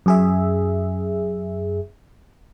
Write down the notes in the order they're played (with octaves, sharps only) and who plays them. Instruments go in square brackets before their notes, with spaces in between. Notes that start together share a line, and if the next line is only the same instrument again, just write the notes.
[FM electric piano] F#2 G#4 E5